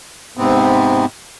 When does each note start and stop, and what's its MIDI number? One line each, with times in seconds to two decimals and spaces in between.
0.37 1.06 44
0.37 1.06 48
0.37 1.06 59
0.37 1.06 60